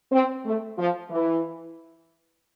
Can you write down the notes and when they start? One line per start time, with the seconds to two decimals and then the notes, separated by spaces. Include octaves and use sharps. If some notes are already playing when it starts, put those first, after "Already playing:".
0.12 C4
0.45 A3
0.78 F3
1.11 E3